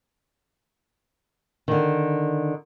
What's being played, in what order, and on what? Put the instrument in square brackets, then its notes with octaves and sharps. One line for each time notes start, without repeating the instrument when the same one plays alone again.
[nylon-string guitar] D3 D#3